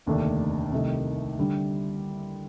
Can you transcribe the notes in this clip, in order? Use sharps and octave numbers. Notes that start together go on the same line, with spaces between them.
F1 D#2 D3 A3 D4
C2 C3 D#3 A3 D#4
D3 G3